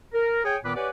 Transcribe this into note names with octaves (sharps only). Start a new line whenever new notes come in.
A#4
G#4 C#5 G5 G#5
A#2 D#3 B3 B4 D6
G4 B4 C#5 D5 F#5 G#5